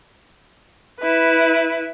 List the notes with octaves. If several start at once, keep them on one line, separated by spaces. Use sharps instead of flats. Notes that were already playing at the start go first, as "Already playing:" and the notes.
E4 B4